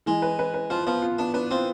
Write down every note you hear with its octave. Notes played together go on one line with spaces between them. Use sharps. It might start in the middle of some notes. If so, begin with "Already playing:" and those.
E3 G#3
B4
B4
B4
F3 F4
F3 B3
F4
B3 D4
D4 B4
C4 F4